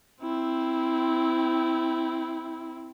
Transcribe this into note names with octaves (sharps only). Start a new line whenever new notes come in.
C4 E4